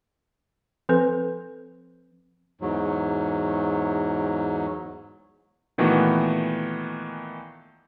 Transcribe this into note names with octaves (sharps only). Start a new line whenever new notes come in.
F3 C4 A4 B4
E2 G#2 F#3
A#2 D#3 E3 A3 B3 F#4